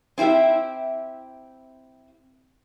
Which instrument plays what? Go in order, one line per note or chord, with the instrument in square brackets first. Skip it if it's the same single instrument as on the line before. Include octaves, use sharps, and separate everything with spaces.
[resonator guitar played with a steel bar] C4 E4 G4 E5